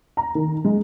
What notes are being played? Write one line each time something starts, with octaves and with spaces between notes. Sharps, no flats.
A#5
D#3
G#3